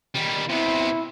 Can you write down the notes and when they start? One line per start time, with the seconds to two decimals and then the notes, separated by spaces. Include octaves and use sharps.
0.15 D#3 G3
0.50 C3 B3 E4